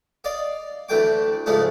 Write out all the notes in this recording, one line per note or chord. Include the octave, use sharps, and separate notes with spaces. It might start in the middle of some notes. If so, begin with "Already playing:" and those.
D5 D#5 F5
D2 E3 A3 G5 D6
C#2 G#2 F3 G#3 A3 D4